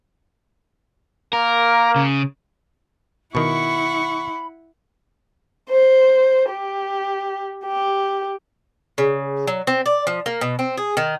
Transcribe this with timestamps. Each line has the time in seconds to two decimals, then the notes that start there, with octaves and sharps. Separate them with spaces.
1.33 A#3 A#4
1.96 C#3
3.35 B2 D#3 E4 F#5 B5 C#6
5.69 C5
6.50 G4
7.65 G4
8.98 C#3
9.47 F#3
9.67 C4
9.86 D5
10.07 F3
10.26 A#3
10.41 B2
10.59 C4
10.77 G#4
10.97 D#3